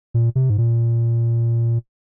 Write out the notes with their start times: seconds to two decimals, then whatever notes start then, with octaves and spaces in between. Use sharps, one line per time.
0.14 A#2
0.35 C3
0.50 G#2
0.58 A#2